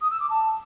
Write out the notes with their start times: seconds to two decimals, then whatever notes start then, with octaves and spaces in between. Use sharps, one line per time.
0.01 D#6
0.11 E6
0.20 D6
0.30 A5